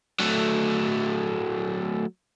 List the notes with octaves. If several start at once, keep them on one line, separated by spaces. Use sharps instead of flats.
F#3 A3